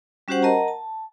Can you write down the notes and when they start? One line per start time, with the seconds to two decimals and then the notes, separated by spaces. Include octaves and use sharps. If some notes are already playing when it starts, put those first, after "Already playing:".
0.28 G3 C#4 F#4 G4 C5 F#5
0.42 A#4 D#5 F#5 A5 A#5
0.68 A5